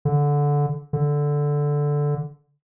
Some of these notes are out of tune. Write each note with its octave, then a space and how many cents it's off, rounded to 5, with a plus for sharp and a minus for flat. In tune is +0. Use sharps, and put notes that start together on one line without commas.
D3 -15
D3 -5